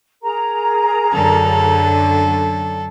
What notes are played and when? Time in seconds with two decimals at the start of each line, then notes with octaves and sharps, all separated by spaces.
0.22 G#4 A#4 A#5
1.13 F#2 D3 F#3 A4